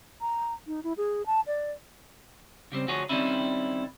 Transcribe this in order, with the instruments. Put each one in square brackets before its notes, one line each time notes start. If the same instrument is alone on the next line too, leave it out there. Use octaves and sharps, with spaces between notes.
[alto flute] A#5
D#4
E4
G#4
A5
D5
[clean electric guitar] C#3 G3 C4
D2 F3 F#4 G#4 C#5
D#3 E3 G3 C4 C#4 E4